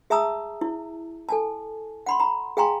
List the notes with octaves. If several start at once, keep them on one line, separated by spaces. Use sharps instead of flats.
G#4 E5 A5 A#5 D#6 E6
E4
A4 G#5 A5
F#5 B5 C6
A#5 B5
G#4 F5 G5 G#5 A#5 C6